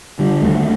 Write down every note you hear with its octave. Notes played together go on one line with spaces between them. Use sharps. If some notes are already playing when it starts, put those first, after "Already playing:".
D3 G3
D#2 A3